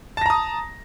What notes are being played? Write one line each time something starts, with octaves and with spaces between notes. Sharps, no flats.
A5 A#5 D#6 A#6